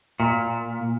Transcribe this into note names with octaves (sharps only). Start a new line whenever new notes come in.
A#2